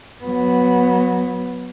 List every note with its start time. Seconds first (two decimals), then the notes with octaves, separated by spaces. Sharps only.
0.24 F#3 B3